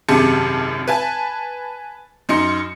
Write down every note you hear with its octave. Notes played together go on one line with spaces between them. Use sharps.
G#1 F#2 C3 G#4 A5 C#7
B4 G#5 A5
F#2 D#4 C6 C#7